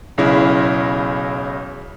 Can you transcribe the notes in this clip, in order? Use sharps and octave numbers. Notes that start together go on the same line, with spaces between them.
B1 C#3 E4